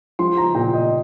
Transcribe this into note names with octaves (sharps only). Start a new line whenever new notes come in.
F3 C6
A#5
A#2 G5
D#5